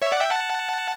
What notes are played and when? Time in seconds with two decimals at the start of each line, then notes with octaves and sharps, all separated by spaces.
0.02 C#5 E5
0.12 D5 F#5
0.21 E5 G5
0.31 F#5 A5